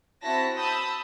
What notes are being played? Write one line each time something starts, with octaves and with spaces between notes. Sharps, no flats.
C4 E4 F#4 A5 A#6 B6
A5 B5 D#6 E6 G6